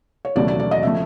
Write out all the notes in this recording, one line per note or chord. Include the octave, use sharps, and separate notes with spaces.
C#5
E1 D#2 C#3 F#3 A3 D5
D5
D5
D#5
C#3 F3 A3 E5